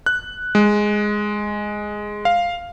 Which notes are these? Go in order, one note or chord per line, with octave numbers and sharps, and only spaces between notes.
F#6
G#3
F5